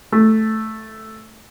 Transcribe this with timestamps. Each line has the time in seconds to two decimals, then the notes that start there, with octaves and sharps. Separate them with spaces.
0.12 A3